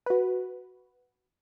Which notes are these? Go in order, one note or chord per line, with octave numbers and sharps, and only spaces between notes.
F#4 B4